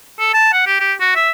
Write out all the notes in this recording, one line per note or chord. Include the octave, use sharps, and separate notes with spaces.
A4
A5
F#5
G4
G4
F#4
E5